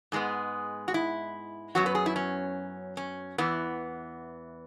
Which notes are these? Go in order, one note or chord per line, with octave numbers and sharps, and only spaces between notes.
G#2 G#3 B3 G#4
F#4
E4
F#2 F#3 B3 F#4
B4
G#4
E4
C#4
C#4
E2 E3 B3